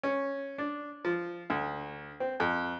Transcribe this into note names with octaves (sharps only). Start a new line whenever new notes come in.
C#4
D4
F3
D2
C4
F2